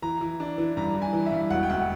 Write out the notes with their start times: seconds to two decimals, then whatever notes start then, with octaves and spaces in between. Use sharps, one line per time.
0.02 E3 A#5
0.21 E3
0.40 D4
0.58 E3
0.77 G2 A#5
0.95 E3
1.02 G#5
1.13 E3
1.26 E5
1.32 G2
1.50 E1 F#5
1.63 G5
1.70 D2 F#5